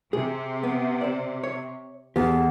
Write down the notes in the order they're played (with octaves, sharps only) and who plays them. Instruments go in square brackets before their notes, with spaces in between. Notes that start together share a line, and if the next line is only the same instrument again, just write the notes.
[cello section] C3 [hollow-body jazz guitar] G#4
[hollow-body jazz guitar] B3
C5 D5
C#5
[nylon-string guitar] E2 [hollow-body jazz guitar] G4 A4